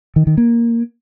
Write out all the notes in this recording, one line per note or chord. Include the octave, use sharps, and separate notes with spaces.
D#3
D#3
A#3